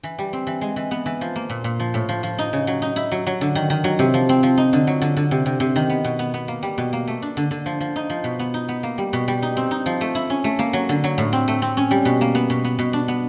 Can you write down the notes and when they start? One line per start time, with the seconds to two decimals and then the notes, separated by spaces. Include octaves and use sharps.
0.03 E3
0.19 G3
0.33 C4
0.47 E3
0.61 G#3
0.76 E3
0.91 B3
1.06 E3
1.21 F3
1.36 A#3
1.50 A#2
1.64 A#2
1.80 F3
1.94 A2
2.09 F3
2.23 F3
2.38 D#4
2.53 C#3
2.67 F#3
2.82 D#4
2.96 E4
3.12 F#3
3.27 F#3
3.41 D3
3.55 D#3
3.70 D#3
3.84 F#3
3.99 C3
4.14 F3
4.29 C4
4.43 F3
4.58 D#4
4.73 D3
4.87 F#3
5.02 D3
5.17 D3
5.31 C3
5.46 C3
5.60 C3
5.76 D#3
5.90 B3
6.04 B2
6.19 B3
6.34 B3
6.48 A#3
6.63 G3
6.78 B2
6.93 A#3
7.08 A3
7.22 D4
7.37 D3
7.51 D3
7.66 F3
7.80 F3
7.96 D#4
8.10 F3
8.24 B2
8.39 B3
8.54 D#4
8.69 B3
8.83 A#3
8.98 G3
9.13 B2
9.28 G3
9.42 D#4
9.57 C4
9.71 D#4
9.86 F3
10.01 A3
10.15 E4
10.30 C#4
10.44 A3
10.59 A#3
10.73 F#3
10.89 D3
11.04 F#3
11.18 A2
11.33 C4
11.48 A3
11.62 C4
11.77 C#4
11.91 G3
12.05 B2
12.21 A#3
12.35 B3
12.50 B2
12.65 B3
12.79 B2
12.93 D4
13.08 B3